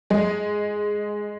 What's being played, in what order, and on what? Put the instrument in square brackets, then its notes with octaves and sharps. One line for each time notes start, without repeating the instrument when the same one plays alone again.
[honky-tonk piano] G#3 G#4